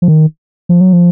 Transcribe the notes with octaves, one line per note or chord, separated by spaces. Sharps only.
F3
D#3
F3
F#3
F3